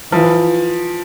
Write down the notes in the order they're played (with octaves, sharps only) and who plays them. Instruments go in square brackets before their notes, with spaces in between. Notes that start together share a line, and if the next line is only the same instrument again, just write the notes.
[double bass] E3 [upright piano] F3